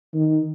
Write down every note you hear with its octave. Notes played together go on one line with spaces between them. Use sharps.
D#3